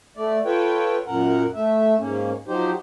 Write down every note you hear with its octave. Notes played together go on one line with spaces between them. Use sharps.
A3 D5
F4 A4 B4 C#5 G5
F#2 A#2 A#4 F#5
A3 E5
G#2 A#3 C#4
F3 F#3 D#4 G4 C5